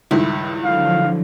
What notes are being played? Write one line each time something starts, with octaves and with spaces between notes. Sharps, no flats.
C#2 G2 D#3 E4
D3 F3 F#3 F5